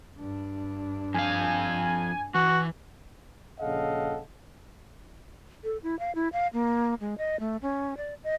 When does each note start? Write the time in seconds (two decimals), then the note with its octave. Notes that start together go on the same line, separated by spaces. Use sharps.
0.18 G2 D4
1.14 F2 F5 G#5
2.35 E3 F#4
3.60 A#1 C#3 A4 D#5 F5 F#5
5.64 A4
5.83 E4
5.99 F5
6.15 E4
6.33 F5
6.53 A#3
7.00 G#3
7.18 D#5
7.40 A3
7.62 C#4
7.97 D5
8.24 D#5